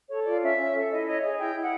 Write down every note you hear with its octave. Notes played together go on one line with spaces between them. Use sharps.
A4 C#5
F4 D5
C#4 E5
C#4
A4
E4 D#5
C#5 D#5
G#4 D#5
E4 G5
E4
F#5